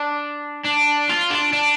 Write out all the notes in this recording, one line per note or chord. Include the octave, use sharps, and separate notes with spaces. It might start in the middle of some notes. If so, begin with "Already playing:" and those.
Already playing: D4
D4
F4
D4
D4